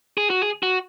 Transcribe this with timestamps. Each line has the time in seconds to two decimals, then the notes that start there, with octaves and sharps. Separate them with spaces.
0.18 G#4
0.30 F#4
0.43 G#4
0.63 F#4